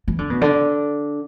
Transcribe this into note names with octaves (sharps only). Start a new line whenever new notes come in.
E3
D3
B2
D3